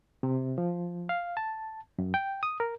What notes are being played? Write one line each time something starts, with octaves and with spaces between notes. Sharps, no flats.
C3
F3
F5
A5
F#2
G5
D#6
A#4